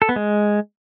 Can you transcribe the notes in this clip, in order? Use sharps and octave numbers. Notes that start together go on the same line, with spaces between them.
A4
B3
G#3